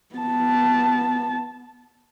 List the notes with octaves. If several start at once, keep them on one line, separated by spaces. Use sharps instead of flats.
B3 A5